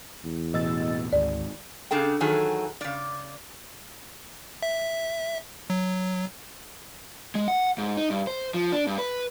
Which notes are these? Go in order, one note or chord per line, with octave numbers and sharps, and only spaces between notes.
E2
A1 B2 D#5 E6 A6
G#1 D2 D5
C#3 D4 G#4 A4 G5
D#3 E3 F#3 G#4 A4
C#3 D5
E5
F#3
G#3
F#5
G#2
D#4
G2
C5
F3
D4
G2
B4